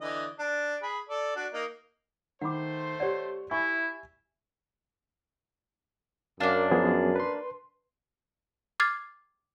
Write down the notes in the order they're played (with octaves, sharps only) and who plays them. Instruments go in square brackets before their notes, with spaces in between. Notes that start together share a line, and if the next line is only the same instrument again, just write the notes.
[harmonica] D3 E3 D#5
D4
G#4 B5
A4 D5
D4 F#4
A#3 D#4 D#5
[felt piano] D#3 [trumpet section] A3 C5 C6 [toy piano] F#5 B5 D6
[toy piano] G4 D5 [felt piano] C#5 F#5
[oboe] E4 [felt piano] E5 G#5 B5 [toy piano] C#6
[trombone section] F#2 [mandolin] A#3 D4 [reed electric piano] F5 A5
[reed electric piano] F3 B3 G#4
B4 C6
[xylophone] D6 F6 G#6 A6 C7